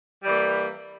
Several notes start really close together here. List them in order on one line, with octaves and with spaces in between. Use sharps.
G3 E3 A#3